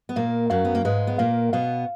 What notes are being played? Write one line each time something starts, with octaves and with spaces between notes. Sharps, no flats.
B3
A#2 A#3 F5
F#2 F#3 F5
B3
A#3
G#2 G#3 B4
B3
A#2 A#3 F5
B2 B3 F5